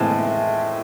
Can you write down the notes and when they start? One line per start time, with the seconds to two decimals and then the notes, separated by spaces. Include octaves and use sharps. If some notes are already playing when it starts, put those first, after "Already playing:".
Already playing: A2 E3 G#3 C4 A5